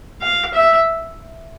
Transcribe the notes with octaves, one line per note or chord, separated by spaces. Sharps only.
F5
E5